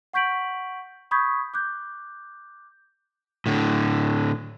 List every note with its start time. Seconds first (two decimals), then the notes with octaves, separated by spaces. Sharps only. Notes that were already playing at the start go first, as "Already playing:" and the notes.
0.13 F#5 C#6 G6 B6 D7 F#7
1.11 B5 C#6 D#6 G6 G#6 B6
1.54 D6 F#6 G6
3.46 A2 D3